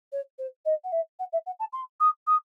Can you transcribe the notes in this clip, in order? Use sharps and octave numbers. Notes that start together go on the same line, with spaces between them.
C#5
C5
D#5
F#5
E5
F#5
E5
F#5
A5
C6
D#6
D#6